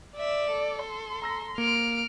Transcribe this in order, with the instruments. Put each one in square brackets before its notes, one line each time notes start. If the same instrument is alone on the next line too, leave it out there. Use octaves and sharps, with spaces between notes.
[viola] D5 [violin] E5 E7
[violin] A4
[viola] C6
[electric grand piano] A#5 E6 A#6
[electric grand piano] A#3 [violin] F6 D7